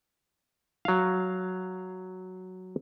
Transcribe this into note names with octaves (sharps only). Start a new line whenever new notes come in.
F#3 F5